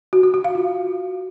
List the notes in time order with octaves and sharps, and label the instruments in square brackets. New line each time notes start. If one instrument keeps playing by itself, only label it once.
[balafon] F#4
F#4
F#4
F5
F4